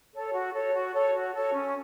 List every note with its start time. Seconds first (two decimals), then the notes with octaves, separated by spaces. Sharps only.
0.13 A4 C#5
0.33 F#4
0.53 A4 C#5
0.73 F#4
0.93 A4 C#5
1.13 F#4
1.32 A4
1.37 C#5
1.53 C#4